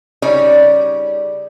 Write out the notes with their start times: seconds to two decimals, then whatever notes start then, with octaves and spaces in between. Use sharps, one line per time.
0.22 C#3 G3 C#4 D#4 C#5 D5